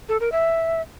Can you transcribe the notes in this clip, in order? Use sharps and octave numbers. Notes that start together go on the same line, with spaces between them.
A4
A#4
E5